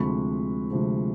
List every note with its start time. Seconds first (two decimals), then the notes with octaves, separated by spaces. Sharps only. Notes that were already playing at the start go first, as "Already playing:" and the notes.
Already playing: D2 C3 F3 G#3 C4 B5 C#6
0.70 D2 C3 F3 G#3 C4